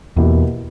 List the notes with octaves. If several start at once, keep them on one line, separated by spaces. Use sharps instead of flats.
E2 B2 A#3 E4 G4